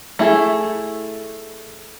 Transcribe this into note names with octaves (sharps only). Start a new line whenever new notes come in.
A3 E4 G#4